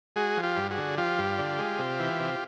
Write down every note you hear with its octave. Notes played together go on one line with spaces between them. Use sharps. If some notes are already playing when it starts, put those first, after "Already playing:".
G#3 F#4 G#4
F3
F4 G4
G2
F#4 G#4
D3
F3 F4 G4
G2
D3
G#3
C3
E3
C3